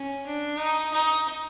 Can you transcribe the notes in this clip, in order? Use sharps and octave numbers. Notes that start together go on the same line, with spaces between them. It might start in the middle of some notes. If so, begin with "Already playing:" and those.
Already playing: C#4
D4
D#4
D#4